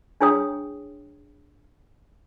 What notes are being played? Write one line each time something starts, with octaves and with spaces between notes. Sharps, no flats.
D4 E4 G#4 C#5 G5 D#6